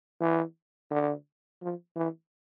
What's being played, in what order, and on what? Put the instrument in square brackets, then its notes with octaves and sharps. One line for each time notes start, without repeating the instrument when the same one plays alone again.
[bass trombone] E3
D3
F3
E3